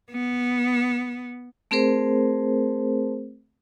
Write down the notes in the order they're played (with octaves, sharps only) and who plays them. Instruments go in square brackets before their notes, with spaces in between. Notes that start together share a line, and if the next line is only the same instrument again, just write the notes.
[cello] B3
[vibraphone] A3 C4 G#4 A#4 C5